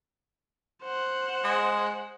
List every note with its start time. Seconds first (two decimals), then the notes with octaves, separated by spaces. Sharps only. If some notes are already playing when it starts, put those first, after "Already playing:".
0.83 C5 F#5
1.44 G#3